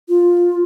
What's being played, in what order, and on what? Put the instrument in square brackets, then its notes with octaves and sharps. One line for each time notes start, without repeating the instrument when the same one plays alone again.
[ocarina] F4